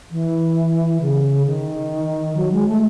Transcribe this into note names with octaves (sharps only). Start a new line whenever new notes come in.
E3
C#3
D#3
F#3
G#3
A3